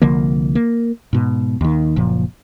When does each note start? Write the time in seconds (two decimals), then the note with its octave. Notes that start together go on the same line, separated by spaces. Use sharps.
0.02 C2 D3 F3 A#3
0.55 A#3
1.13 G#2 B2
1.61 D#2 D#3
1.96 F#1 A#2 F3